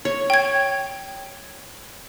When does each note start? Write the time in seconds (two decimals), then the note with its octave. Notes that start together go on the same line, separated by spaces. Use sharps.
0.05 C#5
0.30 G5 G#6